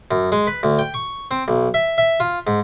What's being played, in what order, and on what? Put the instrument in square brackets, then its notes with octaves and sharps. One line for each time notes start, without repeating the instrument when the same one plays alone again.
[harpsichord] F#2
G#3
B4
D2
G5
C#6
C4
B1
E5
E5
F4
G#2